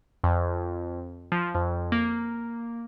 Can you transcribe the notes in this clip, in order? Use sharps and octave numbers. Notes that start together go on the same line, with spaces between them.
F2
F3
F2
A#3